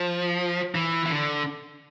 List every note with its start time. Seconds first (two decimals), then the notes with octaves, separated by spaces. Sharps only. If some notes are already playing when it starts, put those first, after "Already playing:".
Already playing: F3
0.75 E3
1.06 E3
1.10 D3